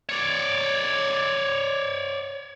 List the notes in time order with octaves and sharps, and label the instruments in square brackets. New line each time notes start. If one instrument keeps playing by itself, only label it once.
[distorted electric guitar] C#5 D5